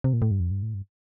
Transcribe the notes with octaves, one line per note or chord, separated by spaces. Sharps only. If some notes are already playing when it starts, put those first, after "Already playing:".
C3
A#2
A2
G2
F2
G2
A2
G2